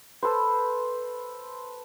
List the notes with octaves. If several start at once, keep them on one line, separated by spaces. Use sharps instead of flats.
A4 B4 C5